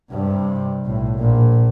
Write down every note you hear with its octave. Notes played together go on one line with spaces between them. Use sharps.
G2 C3
B1 A2
A#1 A#2